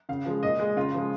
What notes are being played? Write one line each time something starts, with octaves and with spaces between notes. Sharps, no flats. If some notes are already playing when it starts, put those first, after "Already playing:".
C#3 F5
F3 G#3
A#2 D#5
G#3
C#3 F4
F3 G#3